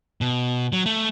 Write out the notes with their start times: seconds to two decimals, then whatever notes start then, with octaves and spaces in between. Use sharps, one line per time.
0.21 B2
0.72 F#3
0.86 A3